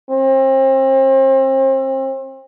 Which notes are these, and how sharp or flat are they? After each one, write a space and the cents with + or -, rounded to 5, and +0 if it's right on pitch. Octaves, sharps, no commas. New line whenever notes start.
C4 +35